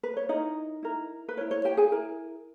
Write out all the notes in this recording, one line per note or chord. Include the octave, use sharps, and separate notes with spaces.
B4
C#5
D#4 E4 A#4 D#5
E4 A#4
B4
E4 A#4 C#5
C#5
G4 G5
G#4 G#5
E4 A#4